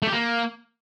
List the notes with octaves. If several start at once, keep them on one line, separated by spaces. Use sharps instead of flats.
A3
G4
A#3